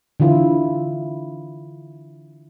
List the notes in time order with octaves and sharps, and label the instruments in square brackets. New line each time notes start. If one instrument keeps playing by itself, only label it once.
[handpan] D3 E3 E4 F4